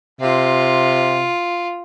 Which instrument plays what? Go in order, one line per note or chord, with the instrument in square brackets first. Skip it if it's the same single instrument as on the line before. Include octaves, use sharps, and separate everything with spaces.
[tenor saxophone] C3 [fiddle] F4